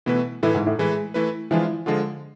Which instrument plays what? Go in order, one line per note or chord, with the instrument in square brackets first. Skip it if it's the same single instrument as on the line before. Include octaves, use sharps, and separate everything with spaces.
[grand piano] B2 [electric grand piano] E3 A3 E4 B4
[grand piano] A2 [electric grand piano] E3 A3 E4 B4
[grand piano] G#2
A2
[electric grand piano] E3 A3 E4 B4 [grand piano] G#3
[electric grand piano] E3 A3 E4 B4
[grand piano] E3 [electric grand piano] F3 G#3 D4 F4
[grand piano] D3 [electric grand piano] F3 G#3 D4 F4